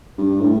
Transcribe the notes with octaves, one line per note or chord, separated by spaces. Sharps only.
G2
A2